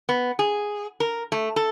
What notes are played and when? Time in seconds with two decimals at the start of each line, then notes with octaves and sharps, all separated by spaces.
0.09 B3
0.39 G#4
1.00 A#4
1.32 A3
1.56 A4